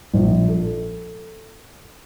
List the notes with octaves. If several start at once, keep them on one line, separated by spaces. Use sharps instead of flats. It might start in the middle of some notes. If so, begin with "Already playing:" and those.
A#1
A4